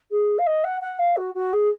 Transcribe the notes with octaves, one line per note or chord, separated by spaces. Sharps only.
G#4
F5
D#5
F#5
F#5
F5
F#4
F#4
G#4